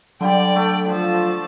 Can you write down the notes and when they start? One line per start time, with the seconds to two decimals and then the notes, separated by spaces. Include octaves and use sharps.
0.21 D3 F#3 G3 G4 D5 F5 G5
0.55 A3
0.89 F3 F4 A5